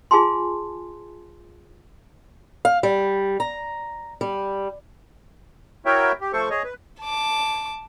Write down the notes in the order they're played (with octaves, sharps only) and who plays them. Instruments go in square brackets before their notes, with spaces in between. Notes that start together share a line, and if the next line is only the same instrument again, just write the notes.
[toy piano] F4 G#4 G#5 A5 C6
[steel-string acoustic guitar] F5
G3
A#5
G3
[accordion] E4 F#4 A#4 C#5 E5 G5
G4
F3 A3 A4 C5 C#6
G#4 C#5 D#5
B4
[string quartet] A5 D6